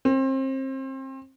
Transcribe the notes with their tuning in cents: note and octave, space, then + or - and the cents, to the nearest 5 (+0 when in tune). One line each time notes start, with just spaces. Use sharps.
C4 +30